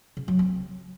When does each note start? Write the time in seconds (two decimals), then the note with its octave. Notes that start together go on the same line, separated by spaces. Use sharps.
0.17 C#3
0.28 F#3
0.39 C4